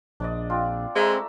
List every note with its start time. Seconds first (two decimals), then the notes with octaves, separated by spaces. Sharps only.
0.20 A#1 D4 D5 D#5
0.50 C4 D4 F4
0.95 G#3 A3 C4 E5 A#5